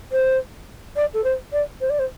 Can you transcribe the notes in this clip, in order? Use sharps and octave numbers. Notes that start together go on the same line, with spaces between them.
C5
D5
A4
C5
D5
C5
D5
C5